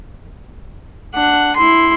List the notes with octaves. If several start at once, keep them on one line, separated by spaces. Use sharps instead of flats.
D4 F#5
E4 C6